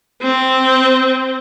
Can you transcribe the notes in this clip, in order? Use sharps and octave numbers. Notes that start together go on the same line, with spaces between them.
C4